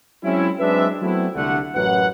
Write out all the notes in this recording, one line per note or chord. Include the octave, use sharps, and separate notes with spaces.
F#3 G#3 C4 C#4 E4
F#3 G#3 C4 D4 B4 E5
F#3 A3 B3 C4 E4
C2 D3 A3 F#5
A1 F#2 E3 F#3 B4 F#5